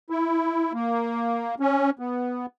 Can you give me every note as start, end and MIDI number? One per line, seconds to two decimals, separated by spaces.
0.10 0.73 64
0.74 1.55 58
1.60 1.90 61
1.99 2.46 59